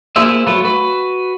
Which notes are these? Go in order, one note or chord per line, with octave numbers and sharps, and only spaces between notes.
A#3 E4 F4 G#4 C5 E5
F#3 A3 F4 B4
F#4 B4